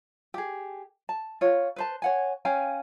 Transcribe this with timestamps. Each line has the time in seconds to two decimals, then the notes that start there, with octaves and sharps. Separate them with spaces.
0.34 G4 G#4
1.09 A5
1.41 F4 C#5
1.76 B4 C5 A5
2.02 C#5 F#5 G#5
2.45 C#4 F5 G5 G#5